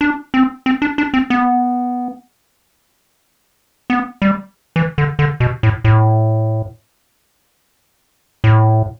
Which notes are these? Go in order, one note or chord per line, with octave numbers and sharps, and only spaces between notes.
D4
C4
C4
D4
D4
C4
B3
B3
G3
E3
D3
D3
B2
A2
A2
A2